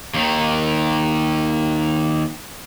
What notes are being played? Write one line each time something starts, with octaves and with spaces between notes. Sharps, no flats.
D#2 D#3